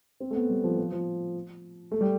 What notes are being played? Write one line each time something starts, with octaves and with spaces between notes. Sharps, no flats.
C4
A3
B3
G3
F3
F3
F3
A3
G3